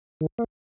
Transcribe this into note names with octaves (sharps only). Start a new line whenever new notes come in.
D#3
A#3